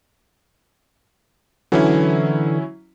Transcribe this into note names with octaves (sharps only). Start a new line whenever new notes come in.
D3 E3 F#3 C#4 E4